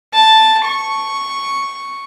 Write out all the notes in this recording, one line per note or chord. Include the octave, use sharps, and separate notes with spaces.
A5
C#6